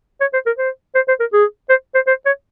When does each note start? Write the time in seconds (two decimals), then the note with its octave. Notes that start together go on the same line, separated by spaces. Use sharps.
0.21 C#5
0.33 C5
0.46 A#4
0.58 C5
0.95 C5
1.08 C5
1.20 A#4
1.33 G#4
1.70 C5
1.95 C5
2.07 C5
2.26 C#5